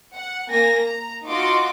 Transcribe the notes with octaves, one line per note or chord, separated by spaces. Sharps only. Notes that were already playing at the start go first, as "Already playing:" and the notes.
F#5
A#3 G#5 A#6
A#5
D#4 F4 F#4 C6 D6